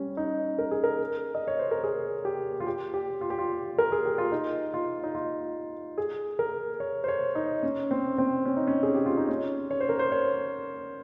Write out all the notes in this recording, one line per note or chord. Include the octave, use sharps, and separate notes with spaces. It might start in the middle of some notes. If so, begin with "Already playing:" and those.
Already playing: G3 C#4
D#4
A#4
G#4
A#4
D#5
C#5
C5
A#4
G#4
G4
F4
G4
G4
F4
G4
F4
A#4
G#4
G4
F4
D#4
F4
D#4
F4
G#4
A#4
C#5
C5
C#5
D#4
C#4
C4
C4
C#4
D#4
C#4
G#4
G4
F4
D#4
C#4
C#5
C5
A#4
C5
C#5